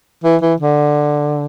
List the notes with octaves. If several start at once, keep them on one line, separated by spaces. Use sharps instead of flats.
E3
E3
D3